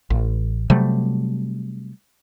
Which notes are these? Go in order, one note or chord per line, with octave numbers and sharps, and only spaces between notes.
A1
C3 F#3 G3 A3